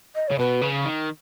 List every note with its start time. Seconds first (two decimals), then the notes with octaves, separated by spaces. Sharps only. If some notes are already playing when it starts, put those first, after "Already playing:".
0.15 D#5
0.28 C#3 C#5
0.39 B2 B4
0.62 C#3
0.86 D#3